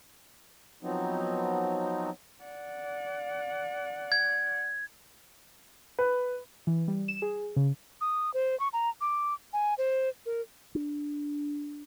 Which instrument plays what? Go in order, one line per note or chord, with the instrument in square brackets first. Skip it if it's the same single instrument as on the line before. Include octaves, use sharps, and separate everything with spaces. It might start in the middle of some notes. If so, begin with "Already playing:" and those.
[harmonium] F3 F#3 B3 C4 D#4
[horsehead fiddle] D5 F#5
[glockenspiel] G#6
[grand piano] B4
[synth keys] E3
G3
E7
G#4
C#3
[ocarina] D#6
C5
C#6
A#5
D6
G#5
C5
A#4
[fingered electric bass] D4